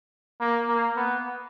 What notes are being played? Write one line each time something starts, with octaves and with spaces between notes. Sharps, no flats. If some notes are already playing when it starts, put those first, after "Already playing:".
A#3
A#3
B3